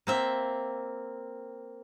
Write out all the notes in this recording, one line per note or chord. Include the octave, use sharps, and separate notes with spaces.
A#3 C4 E5